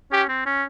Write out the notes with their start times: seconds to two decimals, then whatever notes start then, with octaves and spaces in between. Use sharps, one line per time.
0.11 C#4 G4
0.29 C4
0.46 C#4